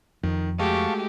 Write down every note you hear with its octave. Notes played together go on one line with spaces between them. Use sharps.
F2 D#3
G#3 A3 F#4 G4 F5 A5 C#6